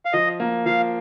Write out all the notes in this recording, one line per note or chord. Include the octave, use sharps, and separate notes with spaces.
F5
F3 D#5
A#3
F3 F5